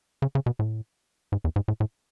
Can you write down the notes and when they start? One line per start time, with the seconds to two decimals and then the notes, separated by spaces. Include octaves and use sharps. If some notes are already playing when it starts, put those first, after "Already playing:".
0.22 C#3
0.35 C#3
0.46 B2
0.59 A2
1.32 G#2
1.44 E2
1.56 G#2
1.68 A2
1.80 A2